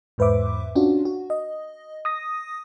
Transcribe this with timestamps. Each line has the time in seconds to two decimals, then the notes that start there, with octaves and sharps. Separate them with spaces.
0.18 E2 G#2 B4 C5 E5 D6
0.75 C#4 D4 F4 F#4
1.05 F#4
1.30 D#5
2.05 D#6 A#6